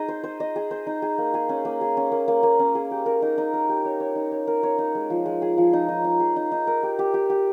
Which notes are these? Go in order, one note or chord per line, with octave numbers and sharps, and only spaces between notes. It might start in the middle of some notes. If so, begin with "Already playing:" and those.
Already playing: D#4 G#4 D#5
C5
C5
D#5
G#4
C5
D#4
G#4
A#3
G#4
C#4
A#3
G#4
C#4
A#3
A#3
A#3
C#4
G#4
G4
A#4
D#4
D#4
A#4
G4
C#5
C#5
D#4
C#5
A#4
C#5
D#4
G#3
F3
G#3
G#4
F3
D#4
D#4
D#4
G#4
D#4
D#4
A#4
G4
G4
G4
G4